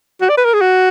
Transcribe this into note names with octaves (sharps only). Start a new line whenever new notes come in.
F#4
D5
B4
A#4
G#4
F#4